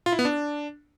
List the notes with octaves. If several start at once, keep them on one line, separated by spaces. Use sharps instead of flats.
F4
E4
B3
D4